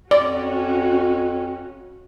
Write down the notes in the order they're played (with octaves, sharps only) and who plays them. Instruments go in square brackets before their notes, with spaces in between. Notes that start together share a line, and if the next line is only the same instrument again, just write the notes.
[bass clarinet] F2 [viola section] C#4 F#4 [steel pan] D5